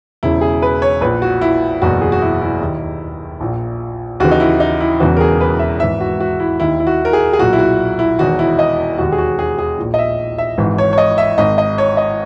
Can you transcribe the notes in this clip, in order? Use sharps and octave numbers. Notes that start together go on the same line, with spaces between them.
E1 E2 C#3 E4
G#4
B4
C#5
A#1 A#2 B4
F#4
E4
F#1 E2 B2 F#4
G#4
F#4
E4
E4
D#2 D#3
A#1 A#2
D#2 C#3 E3 F#4
D#4
E4
D#4
E4
E1 E2 C#3 E3 F#4
A#4
G#4
B4
E5
G#1 G#2 E3 E5
F#4
F#4
E4
D#2 D#3 E4
E4
F#4
A#4
G#4
G#4
B1 A#2 F#4
E4
F#4
E4
E1 E2 D#3 F#4
E4
D#5
E1 D#2 D#3 F#4
G#4
F#4
G#4
G#4
A#1 A#2
D#5
E5
E5
G#1 G#2 E3
C#5
C#5
D#5
E5
G#1 G#2 D#3 D#5
D#5
C#5
D#5